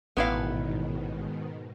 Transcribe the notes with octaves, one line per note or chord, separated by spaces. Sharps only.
A1 G#2 B2 D#3 B3 E4 F5